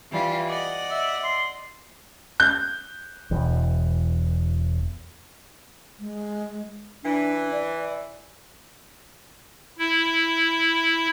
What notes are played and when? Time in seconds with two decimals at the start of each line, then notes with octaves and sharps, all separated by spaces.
0.12 E3 G3 F4
0.49 D5 D#5 F#5
0.91 E5
1.24 C6
2.40 G6
3.31 E1 E2
5.99 G#3
7.04 E3 D4
7.52 D5
9.78 E4